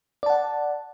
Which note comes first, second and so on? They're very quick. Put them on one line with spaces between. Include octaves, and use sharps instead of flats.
D5 A5 F#5